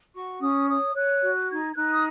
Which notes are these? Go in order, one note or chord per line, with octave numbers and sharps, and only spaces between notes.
F#4 C#6
C#4 D#6
C#5 D#6
C#5 F#6
F#4
D#4 G#6
G#6
D#4 F#6
D#6